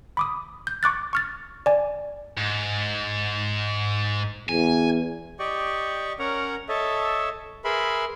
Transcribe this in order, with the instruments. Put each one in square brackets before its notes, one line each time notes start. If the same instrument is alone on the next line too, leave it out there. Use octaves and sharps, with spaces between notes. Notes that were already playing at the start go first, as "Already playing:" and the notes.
[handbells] B5 D6 D#6
G6
C#6 D6 F#6 A6
C#6 F6 A6
D5 G#5
[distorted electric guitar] G#2
[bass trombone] E2 [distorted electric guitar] G#5
[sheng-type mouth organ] G4 D5 D#5 G5 C#6
C#4 A#4 C#5 F#5 A#5
A4 C#5 D#5 E5 A5
G#4 A#4 B4 E5 B5 C6